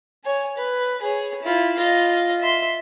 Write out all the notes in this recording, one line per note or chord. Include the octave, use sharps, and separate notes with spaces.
C#5 G#5
B4
G#4 C#5
E4 F4
F4 D#5
E5 C6